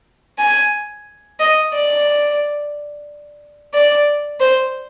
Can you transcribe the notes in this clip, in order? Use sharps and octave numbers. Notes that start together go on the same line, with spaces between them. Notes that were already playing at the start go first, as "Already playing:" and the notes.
G#5
D#5
D5
D5
C5